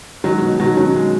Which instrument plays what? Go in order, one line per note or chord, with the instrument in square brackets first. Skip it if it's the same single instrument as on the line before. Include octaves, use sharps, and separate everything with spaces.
[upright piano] D#3 F#3 [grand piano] G#3
[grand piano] B2
[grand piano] B2 [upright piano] D#3 F#3
[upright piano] D#3 F#3 [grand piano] C#4
[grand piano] G#3